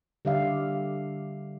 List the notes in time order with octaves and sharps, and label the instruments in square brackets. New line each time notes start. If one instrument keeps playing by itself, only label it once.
[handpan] D3 G3 G4 D5 E5 F5